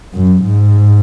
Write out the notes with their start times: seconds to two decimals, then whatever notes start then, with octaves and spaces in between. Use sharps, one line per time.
0.14 F#2
0.44 G#2